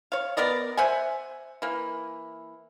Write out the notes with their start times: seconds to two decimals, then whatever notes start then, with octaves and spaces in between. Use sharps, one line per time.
0.12 C#5 F5
0.37 B3 A#4 D5 D#5
0.77 C5 E5 F#5 G#5
1.62 E3 A#3